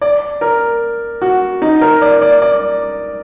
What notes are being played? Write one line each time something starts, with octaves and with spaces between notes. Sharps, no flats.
D5
A#4
F#4
D#4
A#4
D5
D5
D5